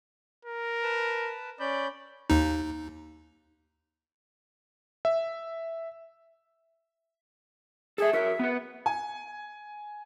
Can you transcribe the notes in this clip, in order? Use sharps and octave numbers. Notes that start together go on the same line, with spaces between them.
A#4
B4 A5
C#4 D5 B5 G6
D#2 D#4
E5
G#4 A4 E5
F#4 A#4 E5
B3 B4
G#5